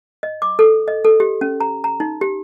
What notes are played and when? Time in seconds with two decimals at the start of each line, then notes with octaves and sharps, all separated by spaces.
0.23 D#5
0.42 D6
0.59 A4
0.88 D#5
1.05 A4
1.20 G4
1.41 C#4
1.60 A#5
1.84 A#5
2.00 D#4
2.21 G4